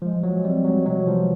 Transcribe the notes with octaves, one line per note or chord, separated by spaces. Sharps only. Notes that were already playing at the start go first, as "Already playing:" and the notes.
F3 G#3
F#3 G#3
G3 C4
F#3 G#3
C3 F#3
E3 F3